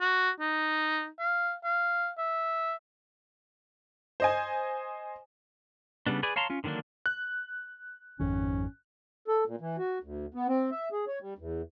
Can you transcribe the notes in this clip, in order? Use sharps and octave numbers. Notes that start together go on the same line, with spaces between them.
F#4
D#4
F5
F5
E5
C5 D#5 G#5
C#3 G3 B3 D4
G#4 B4 D5 G#5
C#5 F5 A5 A#5 C6
C#4 F4
D3 D#3 F#3 A#3 D4
F#6
G#1 F2 D#3 C#4
A4
A#2
E3
F#4
D2
B3
C4
E5
G#4
C#5
G3
E2